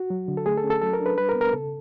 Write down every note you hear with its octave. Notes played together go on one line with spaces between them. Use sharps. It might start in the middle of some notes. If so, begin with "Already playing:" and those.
Already playing: F#4
F#3
D3
A4
A3 G#4
A4
C#4
A4
F#3 A4
A#4
D4
B4
G3 B4
A#4
B3
A#4
C#3 A4